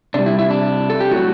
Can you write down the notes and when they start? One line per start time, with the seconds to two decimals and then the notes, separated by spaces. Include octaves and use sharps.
0.14 C3 G3 D4
0.26 E4
0.39 E4
0.50 D4
0.90 A4
1.00 G4
1.12 A2 F#3 F#4